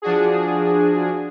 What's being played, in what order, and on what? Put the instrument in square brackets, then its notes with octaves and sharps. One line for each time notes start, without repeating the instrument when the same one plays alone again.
[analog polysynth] F3 D4 F#4 G#4